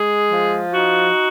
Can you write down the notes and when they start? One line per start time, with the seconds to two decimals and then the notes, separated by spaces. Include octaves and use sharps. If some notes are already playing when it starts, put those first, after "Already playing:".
Already playing: G#3 G#4
0.30 F3
0.74 D#4 F#4